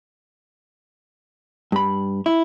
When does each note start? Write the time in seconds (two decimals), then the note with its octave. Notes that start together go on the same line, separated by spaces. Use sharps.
1.72 G2 B5
2.26 E4